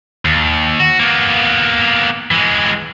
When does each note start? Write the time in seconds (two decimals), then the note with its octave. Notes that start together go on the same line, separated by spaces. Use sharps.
0.25 D#2
0.80 F#4
1.00 A#3 B3
2.31 E3 G#3